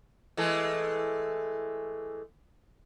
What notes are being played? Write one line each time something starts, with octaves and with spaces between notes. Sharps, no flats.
E3 G#3 A3